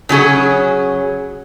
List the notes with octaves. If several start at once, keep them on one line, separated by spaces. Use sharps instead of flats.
C#3 F#3 C#4 G#4